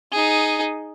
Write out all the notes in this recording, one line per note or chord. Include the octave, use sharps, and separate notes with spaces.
D#4 G#4